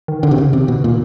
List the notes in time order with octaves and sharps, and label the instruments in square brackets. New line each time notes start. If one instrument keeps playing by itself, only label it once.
[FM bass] D#3
[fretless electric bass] D3 [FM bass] D#3
[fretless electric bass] C3
C#3
C3
B2
A#2